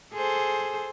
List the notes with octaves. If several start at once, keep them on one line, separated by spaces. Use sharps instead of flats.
G#4 A4 C5